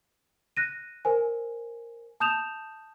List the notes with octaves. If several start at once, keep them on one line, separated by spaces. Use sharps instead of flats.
F#6 A#6 D#7
A#4 C5 G#5
A5 D#6 G6 E7 F7